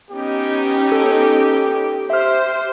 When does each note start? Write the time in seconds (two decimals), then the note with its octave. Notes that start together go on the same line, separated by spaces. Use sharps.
0.11 B3 C#4 D#4 G4
0.92 A4
2.10 G4 C5 E5 F6